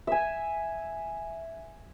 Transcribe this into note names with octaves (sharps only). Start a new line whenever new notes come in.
E5 G#5